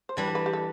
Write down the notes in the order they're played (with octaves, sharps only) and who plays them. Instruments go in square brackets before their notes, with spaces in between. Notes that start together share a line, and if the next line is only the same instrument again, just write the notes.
[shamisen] C5
[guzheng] E3 G3 D4 [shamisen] B4
[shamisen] A4
B4
G4
A4